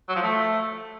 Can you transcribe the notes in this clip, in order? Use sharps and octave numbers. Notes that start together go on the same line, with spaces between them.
F#3
F3
A3